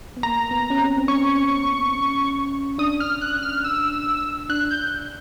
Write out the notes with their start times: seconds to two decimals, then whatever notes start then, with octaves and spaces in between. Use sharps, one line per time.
0.17 B3
0.23 A#3 A#5
0.51 B3
0.70 C#4
0.80 C4
0.98 C4
1.08 C#4 C#6
2.78 D4 D#6
3.00 F6
3.21 F#6
3.43 F6
3.64 E6
4.49 D4 F#6
4.71 G6